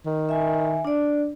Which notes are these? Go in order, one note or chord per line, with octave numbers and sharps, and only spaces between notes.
D#3
E5 G#5
D4 D5